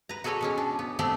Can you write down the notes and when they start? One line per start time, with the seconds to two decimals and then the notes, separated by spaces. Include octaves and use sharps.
0.09 B4 A#5
0.24 F#4 G#4 A4 B4 C#5 D5
0.41 B2 G#3 C#4
0.58 D4
0.79 B3
0.99 A3 B3 C4 D4 G4 D5